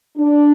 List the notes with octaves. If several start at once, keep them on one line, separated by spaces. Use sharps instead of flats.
D4